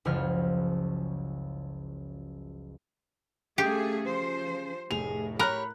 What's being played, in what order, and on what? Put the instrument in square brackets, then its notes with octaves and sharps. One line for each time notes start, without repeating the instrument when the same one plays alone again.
[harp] F#1 C#2 F3 C#5 F6
[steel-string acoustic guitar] C#3 [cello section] A3 G#4 [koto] G4
[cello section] F3 C5
[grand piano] F1 F7 [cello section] A2 [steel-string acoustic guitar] G#4
[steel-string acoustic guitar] G4 C#5 [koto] A#4 [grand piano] B5 F#6